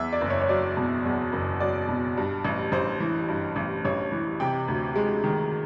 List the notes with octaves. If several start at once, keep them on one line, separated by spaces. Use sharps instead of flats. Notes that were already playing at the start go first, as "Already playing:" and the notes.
Already playing: E2 E5
D5
F#1
C#5
C#5
F#3 D5
B2
E2
F#1
F#3 D5
B2
G2
A1
A1 C5
E3
G2
A1
A1 C#5
E3
C3 G5
D2
G#3
D#3